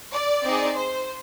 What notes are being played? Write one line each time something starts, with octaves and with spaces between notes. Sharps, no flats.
D5
C4 D#4 G#4
C5